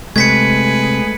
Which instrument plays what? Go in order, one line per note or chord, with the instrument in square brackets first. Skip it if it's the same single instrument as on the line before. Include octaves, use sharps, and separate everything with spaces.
[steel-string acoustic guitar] C3 [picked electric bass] G#3 A3 [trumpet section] G#4 B4 [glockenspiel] G#6 B6 C#7